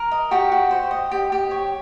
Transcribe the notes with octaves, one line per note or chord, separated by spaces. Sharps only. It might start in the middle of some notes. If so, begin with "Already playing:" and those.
Already playing: A#4
D#5
F#4 G4 G5
F#4
C5
D#5
G4
G4
C#5